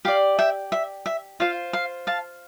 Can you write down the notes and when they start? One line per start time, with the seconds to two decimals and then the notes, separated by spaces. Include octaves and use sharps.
0.05 G4 D5 F5
0.39 E5 G5
0.72 E5
1.06 E5
1.40 F4 C5 F5
1.73 F5
2.07 F5 A5